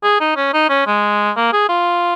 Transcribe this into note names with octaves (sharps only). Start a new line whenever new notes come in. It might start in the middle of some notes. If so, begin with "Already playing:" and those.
G#4
D#4
C#4
D#4
C#4
G#3
A#3
G#4
F4